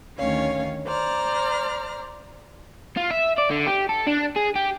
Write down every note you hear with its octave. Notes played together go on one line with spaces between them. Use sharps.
D2 D#3 C#4 C#5 F5
C5 D5 A#5 F6
F4
E5
D5
D3
G4
A4
D4
G#4
G4